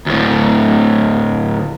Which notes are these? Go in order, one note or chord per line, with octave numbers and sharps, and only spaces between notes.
D2 A2